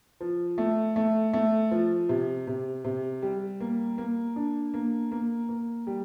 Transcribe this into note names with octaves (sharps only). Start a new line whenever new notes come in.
F3
A3
A3
A3
F3
C3
C3
C3
G3
A#3
A#3
D4
A#3
A#3
A#3
G3